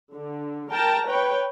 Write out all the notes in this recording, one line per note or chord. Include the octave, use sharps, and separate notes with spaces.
D3
A#4 G5 A5 A#5
B4 C#5 G5